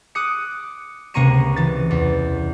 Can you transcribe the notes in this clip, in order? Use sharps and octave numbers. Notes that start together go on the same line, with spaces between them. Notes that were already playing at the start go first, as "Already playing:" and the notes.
D6 D#6 F#6 C#7
C#2 C3 A#3 A#5 C#6 D#7
E3 A6
E2